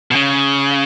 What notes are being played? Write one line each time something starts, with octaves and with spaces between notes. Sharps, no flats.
B2
C#3